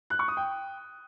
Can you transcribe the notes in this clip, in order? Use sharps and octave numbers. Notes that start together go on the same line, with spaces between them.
F#6
C#6
D#6
G5